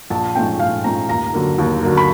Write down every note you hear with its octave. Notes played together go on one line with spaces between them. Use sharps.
A#1 A5
G#2 F3 A3 C#4 G5
A#1 F5
G#2 F3 A3 C#4 A#5
D#2 A#5
D3 F#3 A#3
D#2
D3 F#3 A#3
B5